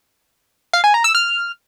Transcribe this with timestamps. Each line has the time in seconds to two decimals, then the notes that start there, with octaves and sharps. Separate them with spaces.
0.73 F5
0.84 G#5
0.94 A#5
1.04 E6
1.15 F6